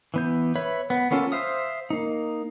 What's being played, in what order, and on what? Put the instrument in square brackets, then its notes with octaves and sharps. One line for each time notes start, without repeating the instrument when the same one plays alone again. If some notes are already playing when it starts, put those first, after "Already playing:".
[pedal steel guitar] E3 B3 G6
B4 C#5 E5 B5
B3 B4
A#3 B3 C#4 F4 A4
C5 E5 F5 D#6
A#3 D#4